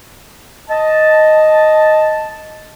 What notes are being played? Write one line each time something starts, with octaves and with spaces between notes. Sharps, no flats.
D#5 A5